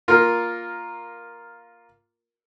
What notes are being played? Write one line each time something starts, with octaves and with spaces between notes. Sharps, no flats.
A#3 F4 A#4